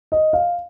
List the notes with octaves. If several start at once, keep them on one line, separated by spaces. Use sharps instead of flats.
D#5
F5